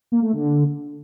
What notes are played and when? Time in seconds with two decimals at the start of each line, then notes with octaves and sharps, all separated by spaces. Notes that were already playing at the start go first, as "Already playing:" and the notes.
0.12 A#3
0.22 A3
0.33 D3